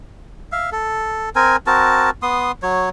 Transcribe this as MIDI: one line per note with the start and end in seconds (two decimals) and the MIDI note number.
0.52 0.70 76
0.52 0.70 77
0.72 1.29 69
1.36 1.56 60
1.36 1.56 70
1.36 1.56 80
1.67 2.10 60
1.67 2.10 66
1.67 2.10 70
1.67 2.10 81
2.22 2.52 59
2.22 2.52 84
2.22 2.52 87
2.63 2.89 54
2.63 2.89 73